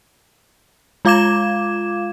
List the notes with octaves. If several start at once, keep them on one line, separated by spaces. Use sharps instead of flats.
G#3 F4 F5 D6 G#6 E7